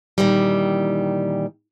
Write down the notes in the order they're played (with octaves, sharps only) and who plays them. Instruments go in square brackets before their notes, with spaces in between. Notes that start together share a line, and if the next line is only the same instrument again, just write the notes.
[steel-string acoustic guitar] A#2 D#3 E3 G3